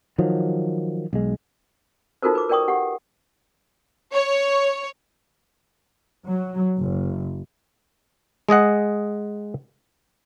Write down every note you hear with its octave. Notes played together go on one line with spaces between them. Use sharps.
D#3 F3 F#3
B1 G#3
D#4 F4 F#4 A4 A#4 C5
B4 D6
A#4 B4 D5 G5 C#6 D#6
G4 F#5
C#5
F#3
F#1
G#3 G#4 D#5 F#5